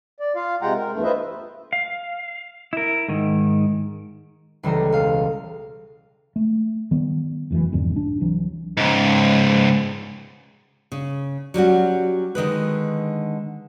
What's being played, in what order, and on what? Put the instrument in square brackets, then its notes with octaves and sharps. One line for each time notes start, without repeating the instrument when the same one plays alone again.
[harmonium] D5
F4 F5
C3 G#3 F4 F#5 G5 A#5
A#4
E2 G2 A3
F4 B4 C5 D#5 E5
[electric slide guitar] F5
E4 A#4
G#2 D#3
[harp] C#2 E3 G3 A4 A#5
E1 F5
[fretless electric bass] A3
D#3 G3 B3
F1 F#2 B2 E3
B1 F2 G#2 D3
D4
C2 E3 F#3
[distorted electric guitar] C#2 G#2
[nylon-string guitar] C#3
F#3 G3 C#4 F#4
D3 D#3 G#3 B4